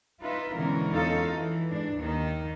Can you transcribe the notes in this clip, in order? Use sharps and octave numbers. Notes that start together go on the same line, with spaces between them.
D#4 F4 B4 E5
B2 D3 E3 G#3 C#4 A#4
E2 C#4 D#4 F4 A4 F5
E3
G#2 D4
D#2 D#3 D#4